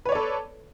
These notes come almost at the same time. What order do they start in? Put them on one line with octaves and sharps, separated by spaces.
B4 C#5 D5 A4